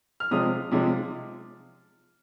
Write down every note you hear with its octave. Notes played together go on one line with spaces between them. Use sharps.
F6
C3 F3 G#3 D#6
C3 F3 G#3